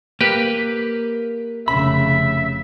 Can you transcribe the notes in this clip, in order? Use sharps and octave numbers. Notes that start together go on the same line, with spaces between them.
A#3 G4 B4
F1 C#3 E5 B5